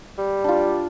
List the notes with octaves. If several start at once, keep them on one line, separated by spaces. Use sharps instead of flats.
G3
D4 F4